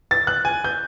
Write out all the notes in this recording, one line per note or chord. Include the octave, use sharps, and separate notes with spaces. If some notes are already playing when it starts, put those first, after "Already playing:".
A6
F#6
G#5
G6